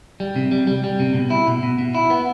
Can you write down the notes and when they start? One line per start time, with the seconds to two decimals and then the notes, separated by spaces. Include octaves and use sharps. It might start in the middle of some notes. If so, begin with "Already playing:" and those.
0.20 G3
0.36 C3
0.52 G3
0.67 G3
0.84 G3
1.00 C3
1.14 B2
1.30 E4
1.47 B2
1.63 B2
1.78 B2
1.95 E4
2.10 B3